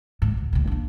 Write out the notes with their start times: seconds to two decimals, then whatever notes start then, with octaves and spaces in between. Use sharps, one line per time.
0.22 G#2
0.37 D2
0.53 D2 B2
0.67 A#3 D4